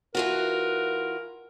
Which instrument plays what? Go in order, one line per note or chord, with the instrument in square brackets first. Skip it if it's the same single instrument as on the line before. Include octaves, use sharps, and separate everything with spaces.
[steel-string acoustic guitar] E3 F4 F#4 [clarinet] A#4